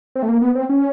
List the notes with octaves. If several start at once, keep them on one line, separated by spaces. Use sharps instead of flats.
C4
A3
A#3
B3
C4
C#4